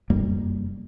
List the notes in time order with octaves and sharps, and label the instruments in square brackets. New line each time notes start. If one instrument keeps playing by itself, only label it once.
[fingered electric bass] F1 F#2 G3 A#3